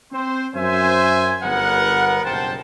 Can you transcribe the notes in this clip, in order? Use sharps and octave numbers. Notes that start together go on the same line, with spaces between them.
C4 C5
F#2 C5 E5 G#5
G1 B3 A#4 F#5
F#1 B1 F#2 C5 G5 A5